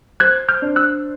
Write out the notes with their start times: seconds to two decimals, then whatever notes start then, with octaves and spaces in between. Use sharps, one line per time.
0.20 C5 F#6 G#6
0.49 F6 G6
0.62 D4
0.76 E6 F#6